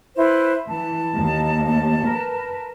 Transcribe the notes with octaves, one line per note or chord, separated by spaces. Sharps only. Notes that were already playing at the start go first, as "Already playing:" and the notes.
E4 B4 C5
E3 A5
D#2
A#4 B4